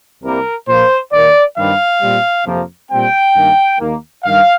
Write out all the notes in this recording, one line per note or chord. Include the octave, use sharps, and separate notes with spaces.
C2 C3 G3 A#3 A#4
A#2 F3 A#3 C5
D#2 D#3 A#3 D5
G2 D#3 G3 C4 F5
A#2 G3 C4
F2 C3 F3 A#3
A#2 G3 C4 G5
G2 D#3 A#3
D#2 D#3 A#3
G2 D#3 G3 F5